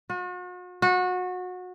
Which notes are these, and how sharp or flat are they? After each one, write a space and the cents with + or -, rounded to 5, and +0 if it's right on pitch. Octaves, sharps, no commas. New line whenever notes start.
F#4 -45
F#4 -25